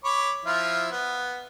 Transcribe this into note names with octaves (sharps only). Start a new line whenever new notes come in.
C#5 B5 D6
F3 E4 F4
B3